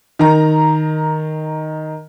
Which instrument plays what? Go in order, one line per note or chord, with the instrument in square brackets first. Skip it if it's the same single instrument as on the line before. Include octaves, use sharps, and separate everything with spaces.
[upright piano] D#3 A#5